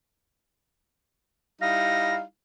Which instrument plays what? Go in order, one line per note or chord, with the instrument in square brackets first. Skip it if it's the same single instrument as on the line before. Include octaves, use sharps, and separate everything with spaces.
[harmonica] G3 D#4 E4 [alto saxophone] F5 [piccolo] A#6